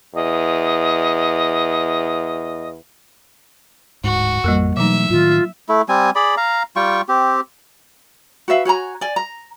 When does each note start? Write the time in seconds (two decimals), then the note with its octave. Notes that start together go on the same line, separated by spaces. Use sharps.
0.15 E2 D#5
4.04 D1 G#2 F#4
4.44 A1 F2 G3 A#3 A#4
4.77 B2 E3 F#3 A3 D#4 E5
5.10 A2 D#3 F4
5.69 A3 E4
5.89 G3 C4 G#5
6.15 G#4 D5 B5
6.37 F5 A#5
6.76 G3 F4 G5 C#6
7.09 C4 G4
8.48 F#4 B4 E5 F5
8.65 F#4 C#5 G#5 A#5
9.01 D5 G#5
9.16 A#5